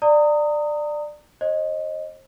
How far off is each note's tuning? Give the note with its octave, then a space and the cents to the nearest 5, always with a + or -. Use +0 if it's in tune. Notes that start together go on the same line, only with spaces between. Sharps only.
D5 +15 A#5 -30 D#6 +0
C5 +40 D#5 +0